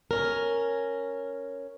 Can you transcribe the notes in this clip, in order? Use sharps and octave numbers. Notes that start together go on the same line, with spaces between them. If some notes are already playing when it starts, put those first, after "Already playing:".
C#4 A#4